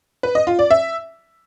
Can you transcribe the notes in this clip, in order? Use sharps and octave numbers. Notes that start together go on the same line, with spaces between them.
B4
D#5
F4
D5
E5